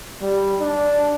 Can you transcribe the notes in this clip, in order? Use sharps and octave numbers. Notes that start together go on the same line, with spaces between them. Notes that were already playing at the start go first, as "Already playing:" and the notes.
G3
D4